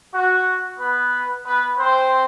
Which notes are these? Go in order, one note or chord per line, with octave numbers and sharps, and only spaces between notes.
F#4
B3 B4
B3 B4
C4 C5